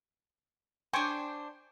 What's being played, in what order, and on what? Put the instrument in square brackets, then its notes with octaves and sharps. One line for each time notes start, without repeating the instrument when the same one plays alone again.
[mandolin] D4 C5 [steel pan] G5 G#5 C#6